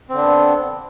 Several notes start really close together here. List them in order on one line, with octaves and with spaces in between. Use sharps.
C4 D3 D4 B3